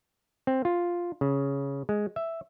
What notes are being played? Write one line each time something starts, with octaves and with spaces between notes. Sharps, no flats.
C4
F4
C#3
G#3
E5